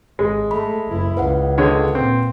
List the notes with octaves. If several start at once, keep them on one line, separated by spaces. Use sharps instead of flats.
G#1 G#3
A3 B5
F#1 E4
C#2 B4 F5 F#5
D3 G#3 C#5
A#2 C4